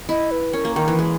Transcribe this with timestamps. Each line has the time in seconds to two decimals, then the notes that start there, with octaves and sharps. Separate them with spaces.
0.09 E4 D#5
0.31 B4
0.53 C#4 A#4
0.65 A#3
0.76 D#3 A#4
0.88 E3
0.99 G#3